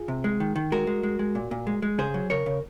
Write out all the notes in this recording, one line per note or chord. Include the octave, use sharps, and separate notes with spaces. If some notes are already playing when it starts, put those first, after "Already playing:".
Already playing: F4 G#4
C3
G#3
D#3
D#3
G#3 F#4 A#4
G#3
G#3
G#3
A#2
A#2
G#3
G#3
C#3 G#4 C5
F#3
C#3 A#4 C#5
C#3